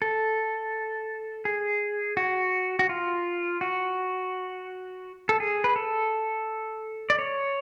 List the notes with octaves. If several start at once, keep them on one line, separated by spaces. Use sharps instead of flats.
A4
G#4
F#4
F#4
F4
F#4
A4
G#4
B4
A4
D5
C#5